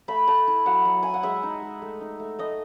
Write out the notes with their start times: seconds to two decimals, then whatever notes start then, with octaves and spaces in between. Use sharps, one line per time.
0.08 A3 B5
0.28 A3 A5
0.47 E4
0.66 F#3 F#5
0.85 F#3
1.03 E4 G#5
1.14 F#5
1.23 G#3 E5
1.43 D#4
1.62 G#3
1.82 A3
2.01 D#4
2.20 A3
2.39 A3 D#5